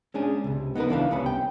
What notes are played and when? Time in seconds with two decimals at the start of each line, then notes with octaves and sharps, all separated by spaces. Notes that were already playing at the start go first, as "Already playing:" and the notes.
0.14 G#3 C#4 D4 G#4
0.44 C#2 C3
0.75 B3 D#4 E4 A#4 B4
0.89 C#2 E3 D4 F5
1.11 C2 C3 B3 C#4 B5
1.26 G5